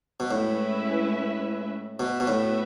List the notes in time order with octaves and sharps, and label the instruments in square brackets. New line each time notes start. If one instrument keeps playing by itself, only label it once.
[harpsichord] B2
[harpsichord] A2 [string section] G#3 C#4 E4 B4 E5
[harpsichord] B2 [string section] B3 F#4 B4 E5
[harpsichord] B2
A2